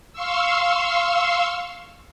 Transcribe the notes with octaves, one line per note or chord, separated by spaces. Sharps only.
F5 C6 C#6 E6